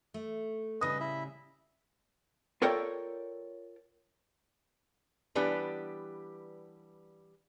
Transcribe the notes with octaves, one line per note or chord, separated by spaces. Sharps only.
A3
A2 C#3 G3 B4 D#5 D#6
E4 E5
F4 A4 A#4 C#5 D5 G5
E3 G3 B3 D4 G4 B4